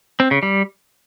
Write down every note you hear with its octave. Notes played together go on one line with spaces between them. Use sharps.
C4
C#3
G3